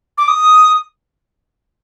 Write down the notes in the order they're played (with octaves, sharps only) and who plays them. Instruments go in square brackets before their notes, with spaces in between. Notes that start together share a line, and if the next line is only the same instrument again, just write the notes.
[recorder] D6
D#6